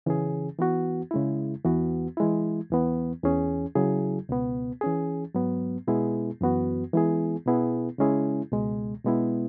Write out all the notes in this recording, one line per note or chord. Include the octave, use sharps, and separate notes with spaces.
C#3 E3 C#4 G#4
E3 B3 F#4
C#3 G#3 E4
E2 E3 B3 F#4
E3 G#3 E4
E2 E3 B3
E2 E3 C#4 G#4
C#3 F#3 E4 G#4
C#2 B2 B3
E3 C#4 G#4
G#2 F#3 B3
B2 G#3 B3 E4 G#4
F#2 E3 B3 F#4
E3 G#3 B3 E4 G#4
B2 B3 E4 G#4
C#3 G#3 C#4 E4 G#4
C#2 B2 G#3
B2 G#3 B3 E4